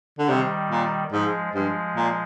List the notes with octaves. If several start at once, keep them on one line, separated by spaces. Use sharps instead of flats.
D3
C3 D#3 G3
A#2
G#2 F3 G#3
G2 F3 G#3
A#2